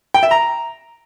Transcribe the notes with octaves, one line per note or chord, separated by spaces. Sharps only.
G5
E5
A#5